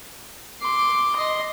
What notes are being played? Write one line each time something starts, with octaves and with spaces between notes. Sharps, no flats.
C6 D6
D#5 C6